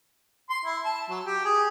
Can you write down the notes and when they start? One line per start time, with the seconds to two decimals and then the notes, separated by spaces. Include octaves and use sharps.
0.50 C6
0.65 E4
0.85 A5
1.10 F#3
1.26 G4
1.45 G#4